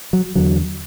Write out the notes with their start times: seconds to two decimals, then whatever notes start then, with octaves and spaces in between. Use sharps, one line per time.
0.13 F#3
0.36 E2 D3 F#3